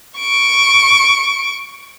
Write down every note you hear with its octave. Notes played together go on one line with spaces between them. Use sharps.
C#6 D7